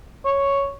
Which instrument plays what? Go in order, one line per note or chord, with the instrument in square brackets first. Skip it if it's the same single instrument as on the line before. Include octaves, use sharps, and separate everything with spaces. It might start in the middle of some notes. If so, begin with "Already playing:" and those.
[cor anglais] C#5